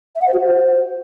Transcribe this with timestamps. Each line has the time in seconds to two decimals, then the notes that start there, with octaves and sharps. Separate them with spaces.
0.15 E5
0.21 F#5
0.27 C5
0.33 F#4
0.39 C5